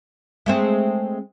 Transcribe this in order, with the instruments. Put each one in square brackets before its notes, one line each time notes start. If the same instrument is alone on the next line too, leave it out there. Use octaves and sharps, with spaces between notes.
[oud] G#3 A3 C4